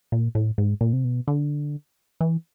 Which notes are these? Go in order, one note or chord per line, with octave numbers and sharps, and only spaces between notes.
A#2
A2
G#2
A#2
C3
B2
D3
E3